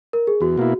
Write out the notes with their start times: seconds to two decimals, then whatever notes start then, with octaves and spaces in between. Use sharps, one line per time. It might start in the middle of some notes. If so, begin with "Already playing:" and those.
0.13 A#4
0.27 G#4
0.41 E2 F#4
0.58 B2 A#3 E4